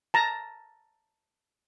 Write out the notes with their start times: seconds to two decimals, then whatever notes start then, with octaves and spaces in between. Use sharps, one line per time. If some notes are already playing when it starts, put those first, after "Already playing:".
0.14 A5 A#5